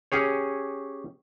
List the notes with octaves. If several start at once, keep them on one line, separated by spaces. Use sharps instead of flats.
C#4 G4 G#4 C#5